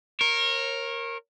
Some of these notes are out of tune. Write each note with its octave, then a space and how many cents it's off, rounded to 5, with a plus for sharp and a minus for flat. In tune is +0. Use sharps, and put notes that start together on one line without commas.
A#4 +0 C#5 -35